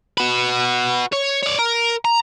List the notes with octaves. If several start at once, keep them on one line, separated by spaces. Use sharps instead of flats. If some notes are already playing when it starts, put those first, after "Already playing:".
F#4 B4
C#5
C#5 D5
A#4
A#5